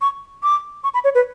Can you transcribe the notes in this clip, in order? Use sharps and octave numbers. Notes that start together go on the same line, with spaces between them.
C#6
D6
C#6
B5
C#5
B4